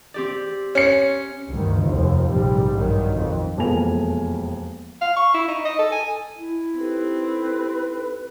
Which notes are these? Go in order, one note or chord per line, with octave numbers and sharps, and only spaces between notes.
C4 G4 D5
C#4 C#7
D2 G2 D#3
F1 D#2 F3
A#1 G#2 C3 G3
A#1 G2 D#3 F#3
F2
E1 F2 A#3 B3 G#5 F7
F5
C#6
E4
D#4
D#5
A4
G#5
E4
C4 D#4 G4 A4 B4